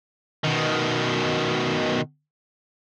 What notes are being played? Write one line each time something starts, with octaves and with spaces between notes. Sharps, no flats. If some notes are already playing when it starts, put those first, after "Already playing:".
B2 D#3